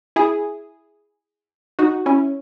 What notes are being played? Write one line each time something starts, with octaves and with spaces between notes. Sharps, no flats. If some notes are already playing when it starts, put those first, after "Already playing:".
E4 G#4
D#4 F#4
C#4 E4